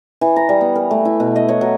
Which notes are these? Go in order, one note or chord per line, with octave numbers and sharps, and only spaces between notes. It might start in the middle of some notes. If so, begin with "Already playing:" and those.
E3
A#5
G3
B3
A#4
A3
E4
B2
D#5
C#5
F#3